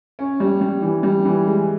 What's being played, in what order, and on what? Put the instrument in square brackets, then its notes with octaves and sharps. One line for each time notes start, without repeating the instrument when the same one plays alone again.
[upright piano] C#4
G3
G3
E3
G3
E3
G#3